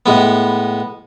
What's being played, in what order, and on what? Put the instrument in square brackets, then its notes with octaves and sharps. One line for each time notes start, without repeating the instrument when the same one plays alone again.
[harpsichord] A2 G#3 B3